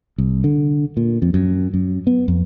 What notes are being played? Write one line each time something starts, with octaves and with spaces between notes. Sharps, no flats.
C2
D3
A#2
F2
F#2
F#2
B3
F2